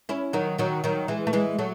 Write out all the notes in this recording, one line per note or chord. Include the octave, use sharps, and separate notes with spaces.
C#4 E4
D#3 F#3
D#3 F#3
D#3 F#3
E3 G#3
A3
E3 G#3
F#3 A3